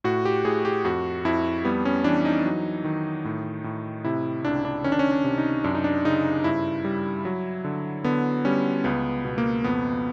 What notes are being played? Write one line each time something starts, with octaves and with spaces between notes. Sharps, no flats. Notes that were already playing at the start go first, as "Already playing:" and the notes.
A2 F#4
G4
A2 G#4
G4
F2 F#4
F2 E4
G3 B3
C#4
E3 D4
D#4
F#3
D#3
A2
A2
C3 E4
C#2 D4
D4
D#3 C#4
D4
C#4
D4
C3
D#4
F#2 D4
D#4
D4
C#3 D#4
G2 E4
G3
F#3
D3
D3 B3
G3 C#4
C#2 B3
B2
A#3
F2 B3